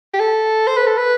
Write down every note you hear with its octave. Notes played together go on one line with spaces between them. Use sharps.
G4
A4
C5
B4
A4
B4